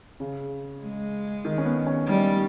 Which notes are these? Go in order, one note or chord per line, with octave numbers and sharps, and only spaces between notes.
C#3
G#3
D#3
C#4
B3
C#4
G3 D#4